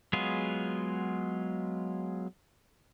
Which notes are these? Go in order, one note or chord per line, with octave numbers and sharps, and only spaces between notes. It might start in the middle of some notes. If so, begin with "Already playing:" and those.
F#3 G#3 B3 F4 G#4